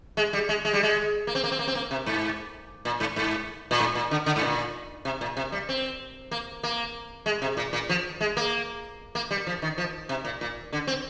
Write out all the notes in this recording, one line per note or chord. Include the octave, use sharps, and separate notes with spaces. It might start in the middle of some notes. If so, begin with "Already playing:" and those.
G#3
G3
G#3
G#3
G3
G#3
A#3
C4
A#3
C4
A#3
C4
A#3
C3
G#2
A#2
G#2
G#2
A#2
G#2
A#2
D3
D3
G#2
A#2
C3
A#2
C3
G3
C4
A#3
A#3
G#3
C3
A#2
A#2
F3
G#3
A#3
A#3
G3
F3
D#3
F3
C3
A#2
A#2
D3
C4